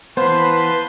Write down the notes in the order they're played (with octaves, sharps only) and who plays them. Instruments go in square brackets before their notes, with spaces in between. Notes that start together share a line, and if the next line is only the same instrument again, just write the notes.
[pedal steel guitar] E3 B3 [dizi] B4 [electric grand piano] C5 [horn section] F5 A5 C6